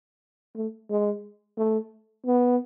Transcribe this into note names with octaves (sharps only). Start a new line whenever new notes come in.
A3
G#3
A3
B3